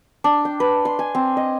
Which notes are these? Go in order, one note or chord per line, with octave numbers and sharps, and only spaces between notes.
D4
G5
B4
C6
G#5
C4
D#5